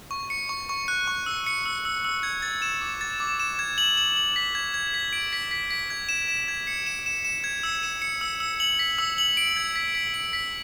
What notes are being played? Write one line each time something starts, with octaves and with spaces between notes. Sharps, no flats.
C#6
C#7
C#6
C#6
F#6
C#6
E6
C#7
E6
E6
E6
G#6
A6
E7
D6
A6
D6
E7
G#6
F#7
F#7
F#7
B6
G#6
G#6
B6
D7
B6
B6
B6
G#6
E7
E7
G#6
C#7
E7
E7
E7
G#6
E6
E7
C#7
E6
E6
F#7
B6
E6
F#7
D7
G#6
B6
B6
D7
B6